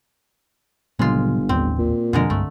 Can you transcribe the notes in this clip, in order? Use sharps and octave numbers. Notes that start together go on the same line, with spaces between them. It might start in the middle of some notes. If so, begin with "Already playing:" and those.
G1 A#2 C#3 F#3 G#3 F4
A1 D#2 C4 D4
A#2
F2 B2 D3 F3 G#3 A#4
C2 G2 A3